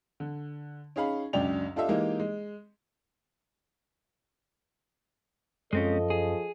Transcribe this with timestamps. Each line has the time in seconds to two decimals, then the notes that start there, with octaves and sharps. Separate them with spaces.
0.20 D3
0.96 C#4 D#4 G#4 F5 B5
1.33 C#2 F#2 D4 D5 G5 F7
1.76 D4 F4 G4 A4 D#5 E5
1.88 E3 G#3 A#3 D#4 G4
2.20 G#3
5.73 F#2 F3 G#3 C4 C#4 A4 D#5
6.10 G#4